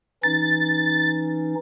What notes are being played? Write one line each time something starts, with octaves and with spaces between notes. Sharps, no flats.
E3 C#4 D#4 A6